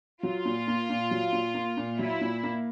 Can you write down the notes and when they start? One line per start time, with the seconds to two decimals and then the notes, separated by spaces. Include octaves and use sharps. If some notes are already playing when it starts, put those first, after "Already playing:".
0.23 F#3 F4
0.45 A#2
0.67 A#3
0.90 A#2
1.11 F#3
1.33 A#2
1.54 A#3
1.77 A#2
1.99 F#3 E4
2.21 A#2
2.43 A#3